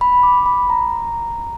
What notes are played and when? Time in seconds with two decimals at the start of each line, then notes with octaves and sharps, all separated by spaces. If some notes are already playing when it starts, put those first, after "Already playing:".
0.01 B5
0.23 D6
0.46 B5
0.70 A#5